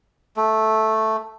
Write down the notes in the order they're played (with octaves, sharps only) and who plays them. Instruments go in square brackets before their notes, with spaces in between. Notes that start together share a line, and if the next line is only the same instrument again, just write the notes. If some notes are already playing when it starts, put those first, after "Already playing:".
[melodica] A3